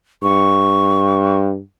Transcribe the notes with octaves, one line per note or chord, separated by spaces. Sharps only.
G2 C#6